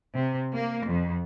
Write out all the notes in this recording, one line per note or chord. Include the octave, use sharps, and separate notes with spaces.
C3
A#3
F2